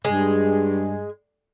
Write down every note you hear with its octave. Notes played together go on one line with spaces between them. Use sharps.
G2 G#3